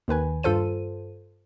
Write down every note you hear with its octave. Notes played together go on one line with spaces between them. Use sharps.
D#2 D#3 B4 G#5
G2 F4 A4 C5 D#7